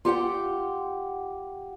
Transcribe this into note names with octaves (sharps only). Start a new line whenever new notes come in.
F4 G4 F#5 G5